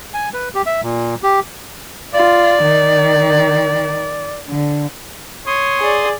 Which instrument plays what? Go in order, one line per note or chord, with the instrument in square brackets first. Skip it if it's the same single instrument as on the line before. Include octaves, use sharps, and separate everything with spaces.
[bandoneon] G#5
B4
G4
E5
A#2
G4
[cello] F4 [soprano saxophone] D5
[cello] D#3
D3
[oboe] C#5 [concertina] C6 D#6
[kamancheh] G#4 D5